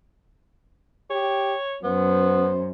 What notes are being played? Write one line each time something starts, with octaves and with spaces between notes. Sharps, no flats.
G4 C#5
F#2 B3 C5